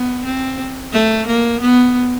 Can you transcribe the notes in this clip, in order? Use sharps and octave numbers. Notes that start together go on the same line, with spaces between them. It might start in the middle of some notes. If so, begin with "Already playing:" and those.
Already playing: B3
C4
A3
A#3
B3